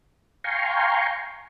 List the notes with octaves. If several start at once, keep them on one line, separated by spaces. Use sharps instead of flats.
F5 G5 G#5 A#5 C6 C#6